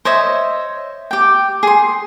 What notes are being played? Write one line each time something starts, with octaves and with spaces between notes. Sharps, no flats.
C5 C#5 D#5 E5
G4 G5
G#4 C6